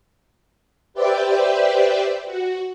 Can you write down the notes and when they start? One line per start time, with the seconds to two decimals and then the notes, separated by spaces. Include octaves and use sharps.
0.94 G4 B4 C5 D5 E5 G5
2.25 F#4